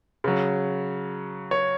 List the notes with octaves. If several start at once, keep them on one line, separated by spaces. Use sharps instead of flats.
C#3 F#3
C#5